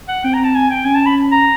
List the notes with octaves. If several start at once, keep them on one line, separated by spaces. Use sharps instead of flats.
F#5
C4 G5
A#5
A5
G#5
G5
C#4 G#5
A5
B5
A#5